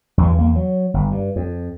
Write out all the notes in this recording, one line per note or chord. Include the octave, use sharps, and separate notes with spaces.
E2 G2
E2 A#3
F#3
G1
G2
F2